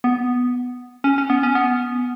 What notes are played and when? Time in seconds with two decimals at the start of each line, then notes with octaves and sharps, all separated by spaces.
0.04 B3
1.04 C#4
1.18 C#4
1.30 B3
1.43 C#4
1.55 B3